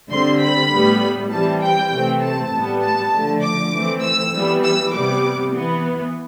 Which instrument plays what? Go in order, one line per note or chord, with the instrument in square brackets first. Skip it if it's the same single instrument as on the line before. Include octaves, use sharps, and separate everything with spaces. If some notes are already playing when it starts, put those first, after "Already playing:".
[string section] D3 G3 C4 C6
B5
A2 G3 B3
E3 G3 C4 A5
G5
C3 E3 A3 C4
A5
A2 G3 B3
A5
D3 F3 A3
D6
E3 A3 C4
E6
E3 G3 B3
E6
C3 G3 B3 D6
E3 B3